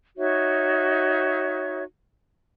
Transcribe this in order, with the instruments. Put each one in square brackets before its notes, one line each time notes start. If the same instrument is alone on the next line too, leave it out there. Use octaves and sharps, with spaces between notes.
[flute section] D#4 F#4 C#5 E5